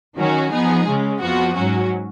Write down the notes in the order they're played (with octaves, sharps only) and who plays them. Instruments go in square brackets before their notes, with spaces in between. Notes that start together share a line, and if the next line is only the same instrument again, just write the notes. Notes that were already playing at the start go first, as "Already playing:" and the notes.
[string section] D#3 F#3 C#4 F#4
F3 B3 D#4 G#4
C#3 G#3 C#4
F2 F3 B3 F#4
G#2 F#3 C#4 F#4